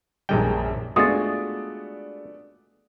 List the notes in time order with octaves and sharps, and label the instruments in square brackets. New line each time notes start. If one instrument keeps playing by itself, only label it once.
[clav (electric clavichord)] A#1 G#3 G5 [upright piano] F#2 D#3 G3
[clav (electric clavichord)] G#3 F4 F#4 [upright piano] A3 B3 D4 [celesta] D#6 A6